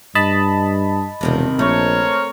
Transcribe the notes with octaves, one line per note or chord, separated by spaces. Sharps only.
G2 D#5 A5 B5
E1 G2 C3 D#3
A#1 A3 A#4 C5 C#5